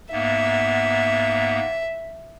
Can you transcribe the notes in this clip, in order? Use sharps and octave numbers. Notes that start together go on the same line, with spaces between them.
G#2 A#3 B3 E5